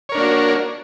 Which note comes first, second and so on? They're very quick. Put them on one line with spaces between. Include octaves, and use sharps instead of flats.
C#5 A#4 D4 A#3 F#4